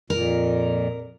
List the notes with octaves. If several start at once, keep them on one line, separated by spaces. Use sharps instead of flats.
F2 A#2 A#4